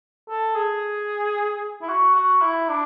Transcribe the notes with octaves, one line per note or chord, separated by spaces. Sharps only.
A4
G#4
E4
F#4
F#4
E4
D4